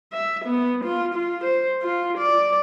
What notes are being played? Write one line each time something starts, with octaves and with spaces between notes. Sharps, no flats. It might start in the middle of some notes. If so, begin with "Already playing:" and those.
E5
B3
F4
F4
C5
F4
D5